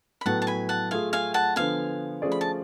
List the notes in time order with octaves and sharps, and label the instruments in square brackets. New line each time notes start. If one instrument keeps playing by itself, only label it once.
[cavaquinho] B5
[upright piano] A2 F#3 B3 [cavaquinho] F#5 A5
[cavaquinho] A5
G#5 B5
F#5 A5
[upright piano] A3 F4 G#4 [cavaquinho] F5 G#5
[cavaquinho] F5 G#5
F#5 A5
[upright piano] D3 F3 B3 [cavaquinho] F5 G#5
[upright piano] F3 A3 C#4 G#4 D5
[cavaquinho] B5
A5